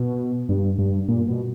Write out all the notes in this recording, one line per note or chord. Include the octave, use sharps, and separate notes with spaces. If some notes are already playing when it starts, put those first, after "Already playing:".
Already playing: B2
G2
G2
A#2
B2